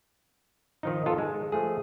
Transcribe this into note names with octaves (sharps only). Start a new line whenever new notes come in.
D#3 F3 D#4
B3 F4 A4
G#3
F3 A3 G#4